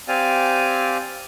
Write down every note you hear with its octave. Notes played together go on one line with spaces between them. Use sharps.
C4 G4 D5 F5 G#5